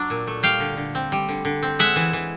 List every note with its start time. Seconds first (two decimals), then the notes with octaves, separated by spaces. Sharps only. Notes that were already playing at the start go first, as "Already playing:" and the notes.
Already playing: F#3 D4
0.10 A#2
0.27 A3
0.43 G3 F5 G5
0.60 D3
0.77 D3
0.95 C4
1.12 G3
1.29 D3
1.45 D3
1.63 C4
1.79 G#3 E5 F#5
1.96 E3
2.13 E3